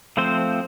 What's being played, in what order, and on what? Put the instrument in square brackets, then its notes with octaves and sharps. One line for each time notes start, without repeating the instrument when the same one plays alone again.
[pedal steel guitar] F3 A3 C4 C5